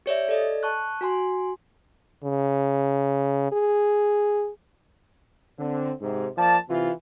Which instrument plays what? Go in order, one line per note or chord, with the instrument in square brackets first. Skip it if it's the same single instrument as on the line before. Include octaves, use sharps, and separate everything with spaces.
[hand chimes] G4 C#5 D5 E5
A4 D5 D#5
A5 C#6 F#6
F#4 G#5 C6
[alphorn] C#3
G#4
[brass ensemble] D3 C4
G#2 C3
F3 A#3 D5 A5
C3 E3 F4